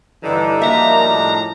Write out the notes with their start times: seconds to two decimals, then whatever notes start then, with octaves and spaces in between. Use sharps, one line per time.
0.23 G2 D3 E3 G3 D4 D#4
0.62 F#2 F3 A#3 E5 A#5
1.05 A2